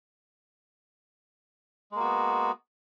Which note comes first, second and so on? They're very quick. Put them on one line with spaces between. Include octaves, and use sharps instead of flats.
G#3 A#3 F#4 B3